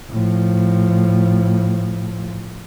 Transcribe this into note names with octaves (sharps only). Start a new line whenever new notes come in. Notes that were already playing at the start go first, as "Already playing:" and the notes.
A2 F3